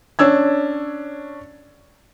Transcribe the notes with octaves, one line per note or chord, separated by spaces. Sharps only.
C#4 D4 E6 G#6